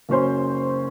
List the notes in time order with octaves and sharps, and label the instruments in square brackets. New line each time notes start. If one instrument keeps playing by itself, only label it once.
[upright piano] F#1 F#3 C#4 C5 C6